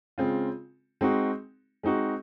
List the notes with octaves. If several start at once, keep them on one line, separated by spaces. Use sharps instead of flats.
C#3 G#3 C4 F4
G#3 C4 D#4 F#4
G#3 C4 D#4 F#4